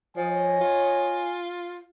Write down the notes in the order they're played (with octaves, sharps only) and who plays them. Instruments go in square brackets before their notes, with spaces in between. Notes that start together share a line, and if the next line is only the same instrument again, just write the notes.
[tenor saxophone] F3 [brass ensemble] C#5 D#5 [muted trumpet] G#5
[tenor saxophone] F4